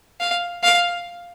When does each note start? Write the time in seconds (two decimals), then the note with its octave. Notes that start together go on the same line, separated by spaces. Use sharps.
0.20 F5
0.64 F5